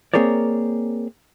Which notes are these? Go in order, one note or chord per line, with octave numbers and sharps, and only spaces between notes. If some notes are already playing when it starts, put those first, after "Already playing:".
A#3 C4 G#4 A#4 C#5 D5